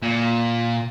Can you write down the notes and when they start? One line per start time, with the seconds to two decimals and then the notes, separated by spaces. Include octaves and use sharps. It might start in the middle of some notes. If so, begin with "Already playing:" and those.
0.02 A#2